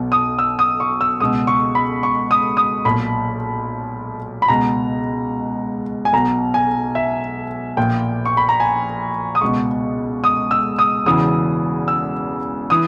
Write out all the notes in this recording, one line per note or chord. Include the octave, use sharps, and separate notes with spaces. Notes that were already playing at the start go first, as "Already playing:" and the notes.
Already playing: B1 B2
D#6
E6
D#6
C#6
E6
C#2 B2 D#6
C#6
B5
C#6
D#6
D#6
B1 A#2 B5
B5
C#2 B2 A#5
G#5
B1 B2 A#5
G#5
E5
A#1 A#2 G5
C#6
B5
A#5
G#5
D#6
C#2 B2 C#6
D#6
E6
D#6
E1 E2 C#3 E3 D#6
E6
E3 D#6